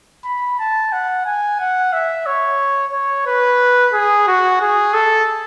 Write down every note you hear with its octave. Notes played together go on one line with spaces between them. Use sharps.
B5
A5
F#5
G#5
F#5
E5
C#5
C#5
B4
G#4
F#4
G#4
A4